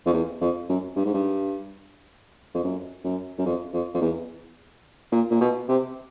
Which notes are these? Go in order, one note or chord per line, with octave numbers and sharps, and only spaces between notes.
F2
E2
F2
F#2
G2
G#2
G2
F2
F#2
F#2
F#2
F2
F2
F2
E2
A#2
A#2
B2
C3